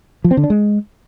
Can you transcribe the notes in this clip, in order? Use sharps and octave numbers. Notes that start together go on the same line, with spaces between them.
F3
C4
D3
D4
G#3